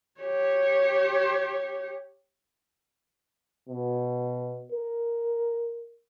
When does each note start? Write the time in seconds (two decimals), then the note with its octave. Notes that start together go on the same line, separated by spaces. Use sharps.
0.21 G4 C#5
3.69 B2
4.72 A#4